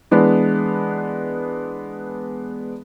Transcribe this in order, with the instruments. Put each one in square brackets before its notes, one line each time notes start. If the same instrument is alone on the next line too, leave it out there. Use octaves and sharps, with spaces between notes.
[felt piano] E3 G#3 B3 D4